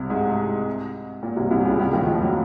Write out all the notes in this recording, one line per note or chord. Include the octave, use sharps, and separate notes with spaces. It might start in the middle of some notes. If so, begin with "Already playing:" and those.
Already playing: C2 C3
G#2
A#2
C2 C3
C2 C3
C#2 C#3
C#2 C#3
D#2 D#3
F2 F3
F#3